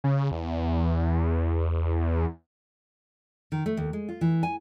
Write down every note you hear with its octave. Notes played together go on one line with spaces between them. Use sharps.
C#3
E2
D#3
A3
D#2
G#3
F4
E3
G#5